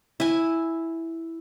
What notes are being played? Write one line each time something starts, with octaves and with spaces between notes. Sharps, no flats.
E4 G#5